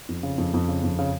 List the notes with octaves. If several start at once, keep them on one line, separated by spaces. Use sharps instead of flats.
F2
C#3
F2
F2
C#3
F2
C#3